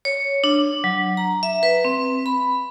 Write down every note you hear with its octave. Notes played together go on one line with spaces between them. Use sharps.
C#5
D4
F#3
A#5
E5
B4
C4
B5